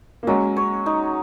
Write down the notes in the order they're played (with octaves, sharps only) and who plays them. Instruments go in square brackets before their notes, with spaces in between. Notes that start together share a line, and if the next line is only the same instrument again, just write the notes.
[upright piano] A#3
[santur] F#3 [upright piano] G#3 C#4
[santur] C#5
D#4